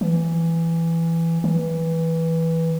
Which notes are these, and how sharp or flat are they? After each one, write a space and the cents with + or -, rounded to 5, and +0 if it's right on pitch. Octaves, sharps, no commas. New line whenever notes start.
E3 +10
E3 -10